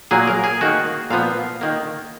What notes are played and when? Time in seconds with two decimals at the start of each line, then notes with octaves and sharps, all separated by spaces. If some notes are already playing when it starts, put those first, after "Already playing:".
0.11 A#2 F#3 A#3 G#4
0.28 A#4
0.44 G#4
0.61 D#3 A#3 F#4
1.10 A#2 F3 B3 F5
1.61 D#3 A#3